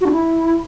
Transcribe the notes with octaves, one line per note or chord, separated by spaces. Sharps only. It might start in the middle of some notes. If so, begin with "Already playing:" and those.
F#4
D4
E4